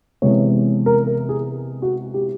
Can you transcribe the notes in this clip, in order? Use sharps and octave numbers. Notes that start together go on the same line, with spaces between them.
C3 E3 G#3 B3 C#5
A#4
A#4
G#4
F#4
G4